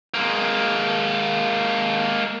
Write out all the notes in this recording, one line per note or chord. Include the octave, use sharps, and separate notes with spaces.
G#3 A#3